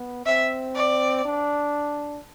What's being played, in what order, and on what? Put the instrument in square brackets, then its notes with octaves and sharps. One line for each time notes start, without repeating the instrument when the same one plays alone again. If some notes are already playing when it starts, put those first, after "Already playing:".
Already playing: [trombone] B3
[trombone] C4 [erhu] E5
[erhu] D5
[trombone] D4